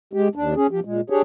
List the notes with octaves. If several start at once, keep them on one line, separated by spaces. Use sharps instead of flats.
G#3 G4
D#2 D4
C#4 G#4
F3 G4
A#2 G#3
D4 G4 G#4 C#5